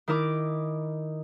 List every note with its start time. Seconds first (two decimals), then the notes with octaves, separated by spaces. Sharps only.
0.08 D#3 E4 A#4 D6